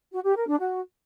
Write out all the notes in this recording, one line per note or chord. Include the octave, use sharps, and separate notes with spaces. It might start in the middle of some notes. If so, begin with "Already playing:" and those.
F#4
G4
A#4
D4
F#4